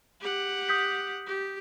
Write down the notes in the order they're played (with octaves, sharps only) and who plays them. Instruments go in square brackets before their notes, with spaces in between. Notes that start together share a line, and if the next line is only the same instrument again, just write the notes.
[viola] G4 F#5
[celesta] D#6 G6 B6
[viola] G4